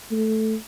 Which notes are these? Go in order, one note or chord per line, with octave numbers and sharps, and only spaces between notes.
A3